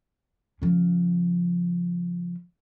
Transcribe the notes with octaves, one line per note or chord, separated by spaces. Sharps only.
C#3 F3